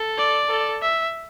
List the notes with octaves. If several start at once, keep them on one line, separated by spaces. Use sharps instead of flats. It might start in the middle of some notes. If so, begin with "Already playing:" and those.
Already playing: A4
D5
A4
E5